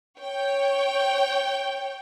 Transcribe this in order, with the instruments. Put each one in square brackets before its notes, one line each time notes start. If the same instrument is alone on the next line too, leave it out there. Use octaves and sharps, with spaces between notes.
[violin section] C#5 G5